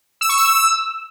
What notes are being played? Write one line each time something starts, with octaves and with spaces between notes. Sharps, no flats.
E6
C#6
E6